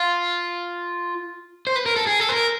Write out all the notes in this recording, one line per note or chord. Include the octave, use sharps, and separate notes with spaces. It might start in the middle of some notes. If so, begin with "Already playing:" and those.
Already playing: F4
C5
B4
A#4
A4
G#4
A4
B4
A#4